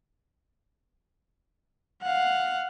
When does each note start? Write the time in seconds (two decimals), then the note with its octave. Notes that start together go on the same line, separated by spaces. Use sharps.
2.03 F5 F#5